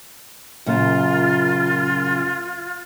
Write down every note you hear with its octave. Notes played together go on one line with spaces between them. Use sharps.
F#2 A#2 C#3 F4